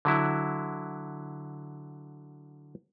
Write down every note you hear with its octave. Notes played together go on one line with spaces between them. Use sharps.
D3 F#3 E4